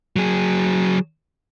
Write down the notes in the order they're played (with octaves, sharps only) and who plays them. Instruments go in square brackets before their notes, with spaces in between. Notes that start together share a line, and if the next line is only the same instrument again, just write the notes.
[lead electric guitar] F#3 G#4